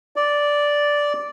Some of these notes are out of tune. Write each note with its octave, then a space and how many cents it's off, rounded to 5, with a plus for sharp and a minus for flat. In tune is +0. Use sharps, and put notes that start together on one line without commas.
D5 -5